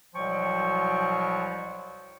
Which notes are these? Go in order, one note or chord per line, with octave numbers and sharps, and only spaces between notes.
C2 B2 F3 F#3 G5 C#6